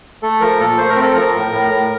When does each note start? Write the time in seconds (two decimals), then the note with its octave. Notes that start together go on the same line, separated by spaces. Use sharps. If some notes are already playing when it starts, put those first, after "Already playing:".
0.23 A3 A4
0.41 F3 A#4
0.59 A#2 A4
0.78 A3 C5
0.89 A#4
0.96 C4
1.02 A4
1.14 F3 A#4
1.35 A2
1.52 A2
1.71 A2